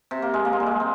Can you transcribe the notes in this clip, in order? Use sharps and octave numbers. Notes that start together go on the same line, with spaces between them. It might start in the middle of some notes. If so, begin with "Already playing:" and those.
C3
A#3
G#3
A#3
G#3
G3
G#3
C4